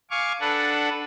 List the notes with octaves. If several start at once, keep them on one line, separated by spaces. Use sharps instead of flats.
F5 G#5 C#6 D6
D4 A4 B4 F#5